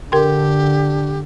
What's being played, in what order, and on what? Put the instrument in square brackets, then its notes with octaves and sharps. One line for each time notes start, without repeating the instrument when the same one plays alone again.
[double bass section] D3 [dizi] G4 [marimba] A#4 G5 C6